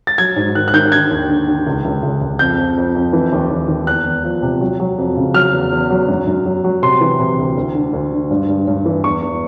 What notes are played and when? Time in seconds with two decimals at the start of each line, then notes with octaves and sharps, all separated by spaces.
0.07 A6
0.18 F#3 G#6
0.36 G#2
0.55 D#3 F#6
0.68 F#6
0.74 D#3 G6
0.92 D3 G#6
1.11 D#2
1.29 D3
1.48 D3
1.67 C#2
1.85 C#2
2.03 C#2
2.21 C#2
2.39 F2 G6
2.58 F2
2.77 F2
2.95 F2
3.13 E3
3.32 D#2
3.51 D#2
3.68 D#2
3.87 E2 F#6
4.06 E2
4.24 F3
4.42 C3
4.61 F#3
4.80 F#3
4.98 F2
5.17 C#3
5.34 F#3 F6
5.53 E2
5.72 E2
5.91 F#3
6.08 F#2
6.27 F#2
6.46 F#3
6.64 F#3
6.83 C3 C6
7.01 E3
7.20 C3
7.39 D2
7.57 D2
7.75 D3
7.93 D2
8.12 D3
8.30 G2
8.49 G2
8.67 G2
8.86 E3
9.04 E2 C#6
9.23 E2